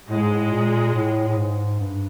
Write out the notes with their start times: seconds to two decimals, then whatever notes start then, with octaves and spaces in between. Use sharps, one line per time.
0.09 A2 G#3
0.22 G#2
0.34 A2
0.51 A#2
0.94 A2
1.27 A2
1.37 G#2
1.80 G2